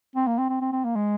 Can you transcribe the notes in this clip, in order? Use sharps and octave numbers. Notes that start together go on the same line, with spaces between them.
C4
A#3
C4
C4
C4
C4
A#3
G#3